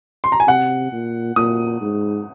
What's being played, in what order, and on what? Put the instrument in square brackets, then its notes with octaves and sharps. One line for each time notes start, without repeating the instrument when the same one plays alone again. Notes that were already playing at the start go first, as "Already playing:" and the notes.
[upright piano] C6
A#5
G#5
[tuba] C3 [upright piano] F#5
[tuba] A#2
[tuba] A#2 [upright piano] D#6
[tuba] G#2